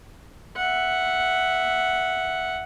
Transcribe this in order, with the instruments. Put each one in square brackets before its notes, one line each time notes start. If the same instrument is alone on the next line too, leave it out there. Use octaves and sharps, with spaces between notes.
[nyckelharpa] E5 F#5